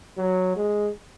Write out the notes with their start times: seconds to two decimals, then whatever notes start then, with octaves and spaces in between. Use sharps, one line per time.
0.17 F#3
0.56 G#3